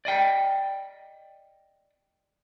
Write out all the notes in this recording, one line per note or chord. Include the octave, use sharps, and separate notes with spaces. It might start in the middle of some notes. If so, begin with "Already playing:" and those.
D5 D#5 G5